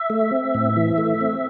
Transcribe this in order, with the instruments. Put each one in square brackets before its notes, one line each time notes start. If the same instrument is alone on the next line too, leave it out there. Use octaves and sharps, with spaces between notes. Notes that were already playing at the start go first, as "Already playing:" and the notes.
Already playing: [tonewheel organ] E5
A3
C4
A2
E3
A3
C4